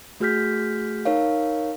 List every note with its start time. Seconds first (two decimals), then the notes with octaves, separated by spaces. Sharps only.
0.20 A3 F#4 G#4 F6 G6 B6
1.05 D#4 A#4 C#5 F5